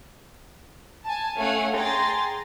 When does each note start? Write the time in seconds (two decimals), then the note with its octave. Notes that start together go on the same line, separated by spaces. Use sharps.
1.04 G#5 A5
1.37 A3 C#4 F5 F#5 G#5
1.72 G#4 G5 A#5 C6 A6